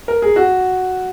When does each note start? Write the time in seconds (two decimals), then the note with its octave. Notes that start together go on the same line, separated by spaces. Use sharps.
0.08 A#4
0.22 G#4
0.36 F#4